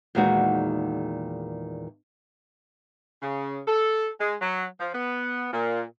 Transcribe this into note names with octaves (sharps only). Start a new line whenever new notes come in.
E2 A#2 D#3 G#3 D#4 F#4
C#3
A4
G#3
F#3
F3
B3
A#2